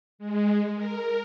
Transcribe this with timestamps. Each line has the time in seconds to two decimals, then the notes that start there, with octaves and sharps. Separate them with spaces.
0.19 G#3
0.75 A#4